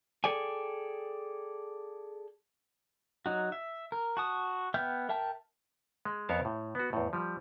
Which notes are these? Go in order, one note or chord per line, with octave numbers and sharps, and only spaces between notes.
G#4 A4 D5 G5 G#5
F#3 D#4 F#4
E5
A#4
F#4 A5 D#6
B3 E5 G5 F6 G6
A#4 E5 G5 A5
G#3
F2 B3 A#4 C#5 F5 A5
A2
B3 F#4
E2 A2
F3 G3